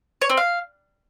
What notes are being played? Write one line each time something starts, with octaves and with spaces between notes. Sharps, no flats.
C#5
C4
F5